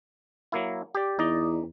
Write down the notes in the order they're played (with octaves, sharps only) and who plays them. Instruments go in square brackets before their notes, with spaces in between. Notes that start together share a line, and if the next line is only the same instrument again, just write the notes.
[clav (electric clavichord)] F#3 A#3 E4
G4 D5
[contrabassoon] E2 [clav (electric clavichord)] D#4 D5 D#5